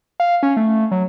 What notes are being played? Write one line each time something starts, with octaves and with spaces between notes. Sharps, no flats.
F5
C#4
A3
F#3